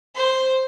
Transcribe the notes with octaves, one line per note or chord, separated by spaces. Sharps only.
C5